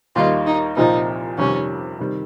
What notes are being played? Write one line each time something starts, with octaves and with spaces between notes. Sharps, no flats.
D#2 D#3 G3 A#3 D#4 F4
D#4
C2 A#2 F3 C4 D#4 F4
F2 C3 D#3 G3 C#4
C3 D#3 G3